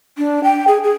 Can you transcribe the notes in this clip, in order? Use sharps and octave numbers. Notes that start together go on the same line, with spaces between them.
D4
G5
G#4
G#4